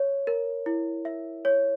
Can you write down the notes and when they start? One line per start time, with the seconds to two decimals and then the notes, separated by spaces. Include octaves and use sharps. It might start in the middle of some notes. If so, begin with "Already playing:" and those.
Already playing: C#5
0.27 A#4
0.66 E4
1.05 E5
1.45 C#5